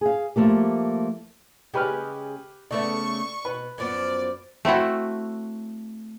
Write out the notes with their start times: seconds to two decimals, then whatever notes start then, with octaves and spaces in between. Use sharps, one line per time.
0.01 G#4 F5
0.36 F3 A3 A#3 G4
1.74 C#3 G#3 G4 G#4 B4 F6
2.71 C#3 A3 B3 D5 C#6
3.45 B2 B4
3.78 F#2 F3 B3 D5
4.65 A3 C4 E4 F#4